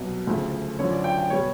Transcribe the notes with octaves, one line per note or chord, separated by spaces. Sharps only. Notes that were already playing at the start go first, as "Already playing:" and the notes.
Already playing: C2 B2 F#3
D2 C#3 F3 A3
F#2 D3 F3 C#5
D5
G5
G5
B2 G3 C#5